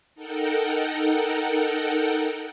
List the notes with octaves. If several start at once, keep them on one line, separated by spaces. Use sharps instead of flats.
D#4 A4 A#4 F#5 G5